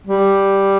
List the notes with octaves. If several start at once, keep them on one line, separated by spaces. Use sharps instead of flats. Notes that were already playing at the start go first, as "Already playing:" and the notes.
G3